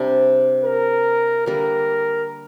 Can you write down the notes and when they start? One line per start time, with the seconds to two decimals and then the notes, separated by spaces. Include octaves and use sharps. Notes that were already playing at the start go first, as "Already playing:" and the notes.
Already playing: C3 G3 D4
0.64 A#4
1.46 D3 G3 A#3 A#4